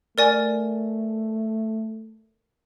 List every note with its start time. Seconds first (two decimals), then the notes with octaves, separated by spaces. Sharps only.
0.18 A3 A#4 D5 G#5